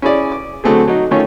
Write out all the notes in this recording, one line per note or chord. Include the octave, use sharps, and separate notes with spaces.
C#4 E4 G#4 D5
D6
D3 F#3 A3 C4 G#4
F#3 D#4
D#3 A3 C#4 F4 C#5